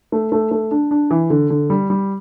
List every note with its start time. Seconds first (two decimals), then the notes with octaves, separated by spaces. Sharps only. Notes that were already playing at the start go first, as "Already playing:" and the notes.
0.12 A3
0.32 A3
0.51 A3
0.71 D4
0.91 D4
1.11 E3
1.30 D3
1.50 D3
1.70 G3
1.90 G3